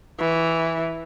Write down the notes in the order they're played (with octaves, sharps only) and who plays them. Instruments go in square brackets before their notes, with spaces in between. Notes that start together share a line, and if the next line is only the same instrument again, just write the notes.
[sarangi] E3